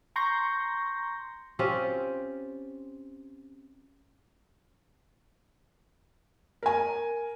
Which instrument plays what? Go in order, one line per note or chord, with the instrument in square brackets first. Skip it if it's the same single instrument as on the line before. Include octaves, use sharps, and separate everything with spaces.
[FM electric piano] A#5 C6 C#6 G6 A#6
[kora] C4 C#4 F4 G4
[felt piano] A#4 G#5